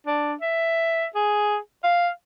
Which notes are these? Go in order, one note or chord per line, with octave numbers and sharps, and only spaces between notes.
D4
E5
G#4
F5